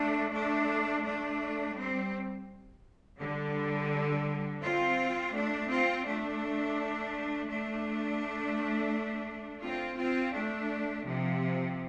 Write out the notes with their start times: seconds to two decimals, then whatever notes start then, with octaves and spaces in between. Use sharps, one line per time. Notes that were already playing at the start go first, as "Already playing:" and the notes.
Already playing: A3 D4
0.32 A3 D4
1.04 A3 D4
1.75 G3 C4
3.19 D3 G3
4.61 C4 F4
5.33 A3 D4
5.68 C4 F4
6.05 A3 D4
7.48 A3 D4
9.63 C4 F4
9.98 C4 F4
10.34 A3 D4
11.05 C3 F3